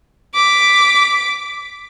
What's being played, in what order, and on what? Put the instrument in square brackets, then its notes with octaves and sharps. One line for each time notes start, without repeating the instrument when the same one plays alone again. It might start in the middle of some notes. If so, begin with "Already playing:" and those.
[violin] D6 B6